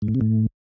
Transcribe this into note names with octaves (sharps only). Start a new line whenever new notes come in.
G#2
A2
C3
A2